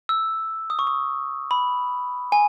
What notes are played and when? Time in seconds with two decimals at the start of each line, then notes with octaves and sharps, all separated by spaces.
0.09 E6
0.70 D#6
0.79 C#6
0.87 D#6
1.51 B5
2.32 G#5